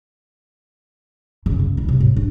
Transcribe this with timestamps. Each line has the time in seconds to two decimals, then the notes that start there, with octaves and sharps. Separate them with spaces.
1.46 F#2 C#3
1.60 C#3
1.77 D2 E4
1.89 C3
2.00 A2
2.16 D4